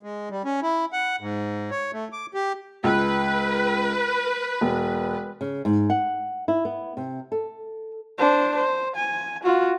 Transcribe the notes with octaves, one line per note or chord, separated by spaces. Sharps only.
G#3
G3
C#4
E4
F#5
G#2
C#5
A3
D6
G4
C#2 B4
E1
C#3
G#2
F#5
E4
B3
C3
A4
D4 C5
C5
G#5
F4 F#4